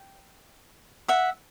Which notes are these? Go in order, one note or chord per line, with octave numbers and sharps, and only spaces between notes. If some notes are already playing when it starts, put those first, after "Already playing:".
Already playing: G5
E5 F#5